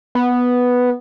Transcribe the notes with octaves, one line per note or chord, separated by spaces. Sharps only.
B3